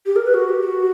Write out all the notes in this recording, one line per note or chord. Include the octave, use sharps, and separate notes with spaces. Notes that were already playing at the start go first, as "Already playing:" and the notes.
G4
A#4
B4
F#4
G4
F#4